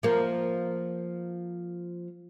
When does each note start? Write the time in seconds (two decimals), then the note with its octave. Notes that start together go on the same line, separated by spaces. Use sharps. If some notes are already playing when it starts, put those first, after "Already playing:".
0.03 F3 A#3